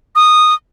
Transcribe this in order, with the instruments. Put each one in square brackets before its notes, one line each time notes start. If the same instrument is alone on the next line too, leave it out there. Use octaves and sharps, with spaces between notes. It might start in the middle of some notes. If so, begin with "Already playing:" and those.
[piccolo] D#6